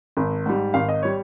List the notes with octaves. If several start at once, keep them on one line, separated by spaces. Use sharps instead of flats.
G#1
G#2 G3
G#1 F5
D#5
G3 C#5